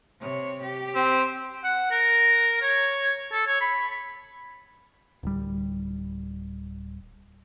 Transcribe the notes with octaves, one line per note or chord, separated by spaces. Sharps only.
C3 C#5
G4
C4
F#5
A#4
C#5
A4
C#5
B5
D1 G3